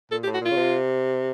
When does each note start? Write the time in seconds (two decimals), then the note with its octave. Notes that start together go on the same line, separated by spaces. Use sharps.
0.12 A#2 A4
0.24 G4
0.27 A2
0.34 F#4
0.41 A#2 F4
0.51 C#3
0.57 C3